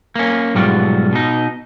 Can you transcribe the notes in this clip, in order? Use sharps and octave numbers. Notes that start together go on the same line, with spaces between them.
A#3 C#4
B1 G#2 G3 F4 F#4
B2 D#4